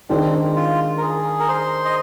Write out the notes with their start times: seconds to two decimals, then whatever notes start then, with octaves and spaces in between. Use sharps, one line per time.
0.09 D#3 G#3 C4 D4
0.56 F4
0.98 A#4
1.02 G#4
1.40 A#4
1.48 C5
1.85 D#5